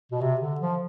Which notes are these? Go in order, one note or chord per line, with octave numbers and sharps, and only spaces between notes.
B2
C3
D3
F3